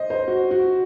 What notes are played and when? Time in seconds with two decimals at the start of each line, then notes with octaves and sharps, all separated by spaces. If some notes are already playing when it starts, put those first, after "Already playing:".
Already playing: C5 D#5
0.10 C5
0.28 F#4
0.51 F#4